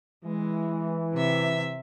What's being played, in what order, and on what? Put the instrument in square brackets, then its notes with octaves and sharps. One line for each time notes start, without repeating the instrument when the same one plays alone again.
[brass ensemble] E3 [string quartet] G#3
[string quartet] C3 E5